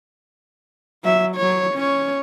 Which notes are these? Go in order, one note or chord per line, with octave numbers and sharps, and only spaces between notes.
F#3 E5
F#3 C#5
C#4 C#5